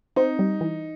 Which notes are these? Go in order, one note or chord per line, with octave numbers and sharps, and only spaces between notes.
C4 D#4
G3
E3